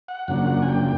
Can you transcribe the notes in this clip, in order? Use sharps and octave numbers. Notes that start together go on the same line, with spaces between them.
F#5
F#2 C#3 F3 A#3 D4 F#5
G#5
G5